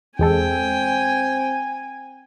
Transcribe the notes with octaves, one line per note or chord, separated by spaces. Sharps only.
E2 G#3 C4 A4 G5 G#5